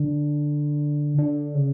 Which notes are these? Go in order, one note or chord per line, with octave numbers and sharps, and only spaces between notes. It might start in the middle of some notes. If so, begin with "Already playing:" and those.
Already playing: D3
D3
C#3